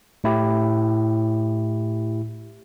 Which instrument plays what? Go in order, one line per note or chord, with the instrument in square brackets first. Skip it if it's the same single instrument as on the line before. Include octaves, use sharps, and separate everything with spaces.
[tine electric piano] A2 E4 G4